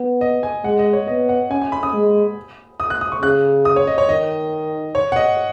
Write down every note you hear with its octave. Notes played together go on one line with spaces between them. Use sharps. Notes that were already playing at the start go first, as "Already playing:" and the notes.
Already playing: B3
D#5
G#5
G#3 F#5
D#5
C#5
B3 D#5
F#5
C#4 G#5
G#5
B5
D#6
G#3
D#6
F#6
D#6
C#6
C#3 F#6
D#6
C#5
D#5
C#5
D#3 D#5
C#5
F#5
D#5